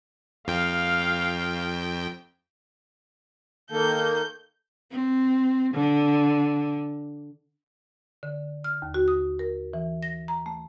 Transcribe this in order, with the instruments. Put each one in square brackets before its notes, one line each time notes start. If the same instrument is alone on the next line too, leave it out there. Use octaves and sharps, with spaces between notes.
[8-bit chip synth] F2 G5 [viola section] F5
[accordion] D#3 A#3 [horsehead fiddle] A4 [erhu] G6
[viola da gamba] C4
D3
[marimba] D3
F6
D#2
F#4
D#6
A#4
E3
A#6
A#5
A3